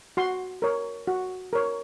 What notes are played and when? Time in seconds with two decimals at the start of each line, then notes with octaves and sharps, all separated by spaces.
0.17 F#4 C6
0.62 A#4 C#5
1.07 F#4
1.53 A#4 C#5